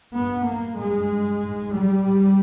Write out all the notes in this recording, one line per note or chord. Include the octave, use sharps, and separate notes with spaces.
G2 B3
A#3
G2 G#3
G#2
G3
G#2